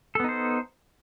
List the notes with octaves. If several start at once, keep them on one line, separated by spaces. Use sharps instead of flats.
B3 D#4 A4 C5